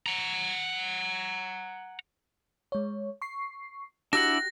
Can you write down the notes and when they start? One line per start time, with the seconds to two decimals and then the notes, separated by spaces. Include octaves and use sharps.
0.06 F#5 A#5
2.72 G#3 C#5
3.22 C#6 C7
4.13 D4 E4 F#4 G4 F#5 F#6 A#6